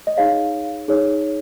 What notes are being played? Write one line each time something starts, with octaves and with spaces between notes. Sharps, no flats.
D#5
D#4 G#4 C#5 F5
D#4 G#4 C#5